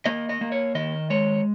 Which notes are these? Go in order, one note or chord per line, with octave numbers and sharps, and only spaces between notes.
A#3 D#5
D#5
A#3
C#5
D#3 D#5
G#3 C#5